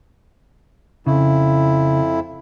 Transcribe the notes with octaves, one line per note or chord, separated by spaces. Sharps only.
F2 C#3 E4